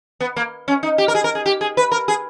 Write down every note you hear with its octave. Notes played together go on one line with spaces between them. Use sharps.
B3
A#3
C#4
D#4
G4
A#4
G#4
A#4
G#4
G4
G#4
B4
A#4
G#4